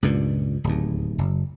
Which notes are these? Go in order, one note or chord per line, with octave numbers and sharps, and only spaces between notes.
C#2 G2 A#2
D1 D#2
F#1